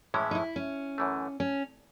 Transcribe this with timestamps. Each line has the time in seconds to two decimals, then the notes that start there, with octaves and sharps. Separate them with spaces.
0.14 A2 E3 G#3 C#4 E4
0.31 D#4
0.35 E4
0.56 C#4
0.98 F#2 E3 A3
1.40 C#4